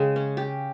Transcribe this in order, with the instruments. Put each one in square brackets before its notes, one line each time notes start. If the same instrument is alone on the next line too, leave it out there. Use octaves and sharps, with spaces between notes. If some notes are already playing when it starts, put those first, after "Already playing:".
Already playing: [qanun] C#3 G#3 G4
C#4
G4